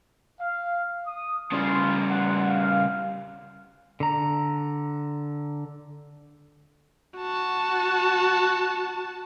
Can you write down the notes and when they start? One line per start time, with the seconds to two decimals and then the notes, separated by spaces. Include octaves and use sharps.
0.41 F5
1.07 D#6
1.52 C#3 G3 E4 F4 C6
2.10 F#5 C6
2.48 F5
4.00 D3 A#5
7.19 F#4 A5